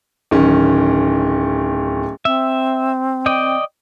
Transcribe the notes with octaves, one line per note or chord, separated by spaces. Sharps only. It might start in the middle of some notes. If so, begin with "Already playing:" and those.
D1 D#3 C#4
C4 E5
D5 D#5 G5